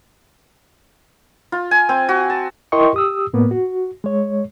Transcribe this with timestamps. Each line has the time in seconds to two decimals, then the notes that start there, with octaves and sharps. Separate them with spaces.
1.52 F4
1.71 G#5
1.89 C4
2.09 F#4
2.30 A5
2.72 E4 A#4 D#5 G5 C6 C#6
2.94 G4 D#6 E6
3.33 A2 A#3 B3
3.51 F#4
4.04 G#3 C#5